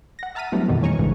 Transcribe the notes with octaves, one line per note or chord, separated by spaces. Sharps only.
F#5 A#6
E5 A5 A#5 F6 B6 D#7
F#3 G3 A3 B3 D4 E4
F2 B2 D#3 E3 G3
A#2 D#3 C#5 G#5 A#5 C#6
A1 E2 G#2 C#3 E3